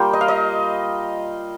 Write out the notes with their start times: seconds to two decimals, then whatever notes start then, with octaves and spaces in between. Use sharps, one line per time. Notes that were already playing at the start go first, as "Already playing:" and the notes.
Already playing: G3 A#3 F4 G5
0.13 D#5
0.21 F5
0.28 D#5